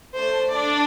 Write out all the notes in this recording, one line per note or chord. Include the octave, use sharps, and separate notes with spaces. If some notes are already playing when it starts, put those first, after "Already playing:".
A3 D4 A4 C5
D4 D5